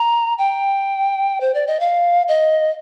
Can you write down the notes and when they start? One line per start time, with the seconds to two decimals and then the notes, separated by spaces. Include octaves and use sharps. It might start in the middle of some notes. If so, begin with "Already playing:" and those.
Already playing: A#5
0.38 G5
1.41 C5
1.54 D5
1.67 D#5
1.80 F5
2.28 D#5